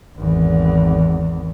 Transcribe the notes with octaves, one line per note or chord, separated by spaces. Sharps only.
G#1 E2